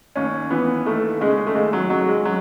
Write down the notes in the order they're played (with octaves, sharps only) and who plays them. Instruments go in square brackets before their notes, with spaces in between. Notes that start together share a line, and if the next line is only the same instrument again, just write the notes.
[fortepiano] D#2 C#4
E3 B3
D#2 A3
C#3 G#3
A3
D#2 G#3
F#3
C#3 F#3
G#3
F#3